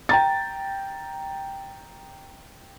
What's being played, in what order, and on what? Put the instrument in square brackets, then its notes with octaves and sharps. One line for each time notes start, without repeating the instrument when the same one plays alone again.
[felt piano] G5 A#5 A6